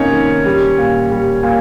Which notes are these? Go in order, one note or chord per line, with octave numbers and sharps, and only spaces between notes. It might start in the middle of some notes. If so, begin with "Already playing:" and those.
Already playing: C3 A#3 C#4 D#4 C#5
D#3
G3
A#2
G3
A#2